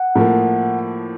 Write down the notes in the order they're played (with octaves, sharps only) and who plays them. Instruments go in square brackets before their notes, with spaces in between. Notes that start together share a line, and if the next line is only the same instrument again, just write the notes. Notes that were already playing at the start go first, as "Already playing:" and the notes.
Already playing: [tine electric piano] F#5
[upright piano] A2 F3 A#3